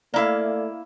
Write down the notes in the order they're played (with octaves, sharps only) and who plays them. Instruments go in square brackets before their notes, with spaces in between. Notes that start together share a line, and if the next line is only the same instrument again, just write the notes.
[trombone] A3 [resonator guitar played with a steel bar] A#3 E4 F5 [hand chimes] D5